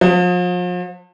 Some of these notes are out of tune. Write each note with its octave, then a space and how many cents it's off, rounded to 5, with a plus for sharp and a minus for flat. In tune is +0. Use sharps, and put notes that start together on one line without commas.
F3 +40